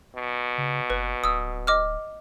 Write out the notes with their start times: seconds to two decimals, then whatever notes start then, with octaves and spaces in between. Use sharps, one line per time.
0.16 B2
0.58 C#3
0.90 F#1 B4
1.24 D1 D#6 E6
1.67 D#5 D6 F6